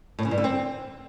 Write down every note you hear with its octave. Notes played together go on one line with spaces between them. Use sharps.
A2
C#3
G2
D3
C4